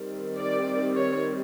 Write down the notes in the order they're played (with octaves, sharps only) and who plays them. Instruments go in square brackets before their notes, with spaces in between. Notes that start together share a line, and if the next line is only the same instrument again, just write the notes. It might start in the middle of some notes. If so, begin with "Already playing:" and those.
Already playing: [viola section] D#3 G3 C4
D5
C#5